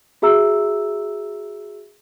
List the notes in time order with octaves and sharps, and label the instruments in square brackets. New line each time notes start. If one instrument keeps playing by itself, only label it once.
[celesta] F#4 G#4 E5 A#5 E6